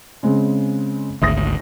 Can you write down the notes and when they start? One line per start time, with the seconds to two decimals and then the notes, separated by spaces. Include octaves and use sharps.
0.23 C#3 G#3 C4
1.22 G#1 D2 E5 D#6 A#6